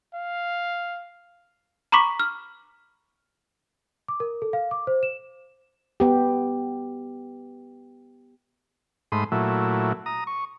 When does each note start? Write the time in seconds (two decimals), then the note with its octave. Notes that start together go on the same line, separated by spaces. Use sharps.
0.14 F5
1.92 A#5 B5 C#6 D6 B6
2.20 F6
4.08 D6
4.20 A#4
4.42 A4
4.53 F5
4.71 D6
4.87 C5
5.03 E7
6.00 B3 G4
9.12 G#2 A3 B5 C6 D#6
9.32 A#2 F#3 A3 E4
10.06 A#5 D#6
10.27 C#6